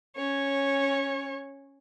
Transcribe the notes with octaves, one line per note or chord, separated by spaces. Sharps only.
C#4 C#5